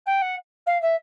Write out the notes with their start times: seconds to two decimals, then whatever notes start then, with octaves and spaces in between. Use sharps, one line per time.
0.06 G5
0.21 F#5
0.66 F5
0.81 E5